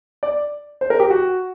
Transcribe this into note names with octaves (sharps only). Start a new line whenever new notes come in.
D5
C5
A#4
G4
F#4